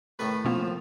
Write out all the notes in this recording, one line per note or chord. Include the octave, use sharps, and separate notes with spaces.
A2 D#3 A3 B4
B2 F3 A#3 B3